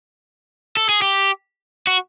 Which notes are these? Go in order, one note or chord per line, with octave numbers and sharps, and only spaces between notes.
A4
G#4
G4
F#4